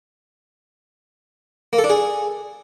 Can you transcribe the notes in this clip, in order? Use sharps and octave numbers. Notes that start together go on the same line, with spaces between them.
A#3
A4
D4
G#4